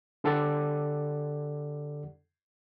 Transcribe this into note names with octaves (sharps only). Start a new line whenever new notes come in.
D3 G4 A4 D5 F#5 A6